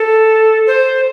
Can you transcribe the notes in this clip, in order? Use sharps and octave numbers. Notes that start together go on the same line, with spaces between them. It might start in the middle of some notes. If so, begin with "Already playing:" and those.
Already playing: A4
C5